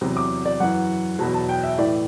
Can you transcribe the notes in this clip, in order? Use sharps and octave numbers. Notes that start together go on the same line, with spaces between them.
E2 C3 F#3
D6
D5
F#2 E3 F#5
E2 B2 F#3 A5
A5
G5
E5
A2 E3 D5